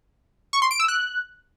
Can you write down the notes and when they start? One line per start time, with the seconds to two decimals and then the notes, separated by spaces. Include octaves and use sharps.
0.53 C#6
0.62 C6
0.71 D7
0.80 E6
0.88 F#6